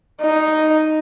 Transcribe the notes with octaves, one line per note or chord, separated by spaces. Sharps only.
D#4